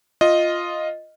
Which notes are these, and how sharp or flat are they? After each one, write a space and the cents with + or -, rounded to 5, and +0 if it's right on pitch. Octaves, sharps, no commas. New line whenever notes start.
F4 +0 D#5 +0